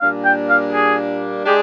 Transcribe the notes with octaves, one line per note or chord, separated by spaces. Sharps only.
A#2 G3 A#3 D4 F5
G5
F5
G#4
G#3 D4 G4 G#4